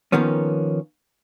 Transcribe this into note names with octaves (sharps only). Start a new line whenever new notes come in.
D#3 F3 A#3 B3 C#4